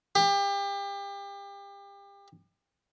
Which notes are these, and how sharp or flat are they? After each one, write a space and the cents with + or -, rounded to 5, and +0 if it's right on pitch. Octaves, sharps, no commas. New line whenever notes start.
G4 +30